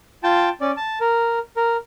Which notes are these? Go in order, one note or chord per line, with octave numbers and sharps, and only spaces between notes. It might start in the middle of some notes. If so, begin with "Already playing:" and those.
F4 G5 A5
C#4 D5
A5
A#4
A#4